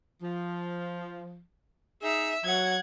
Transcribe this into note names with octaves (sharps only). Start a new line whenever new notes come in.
F3
D#4 G#4 E5
F#3 F#5 G#6